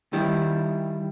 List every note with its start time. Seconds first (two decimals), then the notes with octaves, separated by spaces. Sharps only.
0.13 D#3 G3 E4